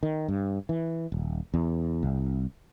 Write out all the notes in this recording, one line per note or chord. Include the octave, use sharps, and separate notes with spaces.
D#3
G2
E3
D#1
E2
C2